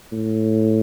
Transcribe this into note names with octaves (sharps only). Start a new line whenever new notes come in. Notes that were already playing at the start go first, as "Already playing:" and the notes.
A2